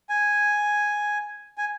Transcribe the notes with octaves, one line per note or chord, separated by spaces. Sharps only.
G#5
G#5